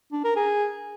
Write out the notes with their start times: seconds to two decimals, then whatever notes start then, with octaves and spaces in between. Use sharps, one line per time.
0.12 D4
0.24 A#4
0.36 G#4